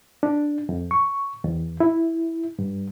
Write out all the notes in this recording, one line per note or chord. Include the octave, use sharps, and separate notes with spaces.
D4
F2
C#6
E2
E4
G2